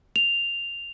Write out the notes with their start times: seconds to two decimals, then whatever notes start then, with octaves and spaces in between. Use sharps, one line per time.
0.16 F7